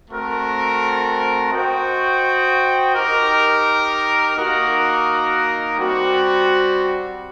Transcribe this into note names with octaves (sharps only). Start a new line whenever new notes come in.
A3 C4 F#4 A#4
F#4 C5 D#5 G5
D#4 G4 A#4
A#3 D#4 F#4 A#4
G3 C4 F#4